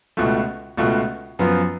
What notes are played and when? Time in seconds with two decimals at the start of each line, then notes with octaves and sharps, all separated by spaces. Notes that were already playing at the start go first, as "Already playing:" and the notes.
0.17 C#2 B2 A3 F4
0.77 C#2 B2 A3 F4
1.39 F#2 F3 B3 F4